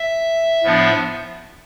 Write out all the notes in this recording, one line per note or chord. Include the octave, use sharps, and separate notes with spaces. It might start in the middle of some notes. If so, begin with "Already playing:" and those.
Already playing: E5
A2 F3 B3 D4